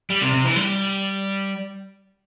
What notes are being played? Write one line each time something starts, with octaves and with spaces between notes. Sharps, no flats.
G3
C3
C3
E3
G3